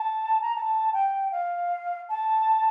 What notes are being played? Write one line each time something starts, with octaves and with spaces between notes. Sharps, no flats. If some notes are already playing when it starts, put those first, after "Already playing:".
Already playing: A5
A#5
A5
G5
F5
A5